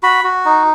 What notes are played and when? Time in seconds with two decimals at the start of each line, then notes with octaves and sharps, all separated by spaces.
0.03 F#4 B5
0.24 F#4
0.45 D#4